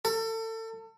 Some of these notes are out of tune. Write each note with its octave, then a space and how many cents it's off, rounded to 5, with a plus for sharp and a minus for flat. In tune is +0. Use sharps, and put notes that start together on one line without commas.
A4 +30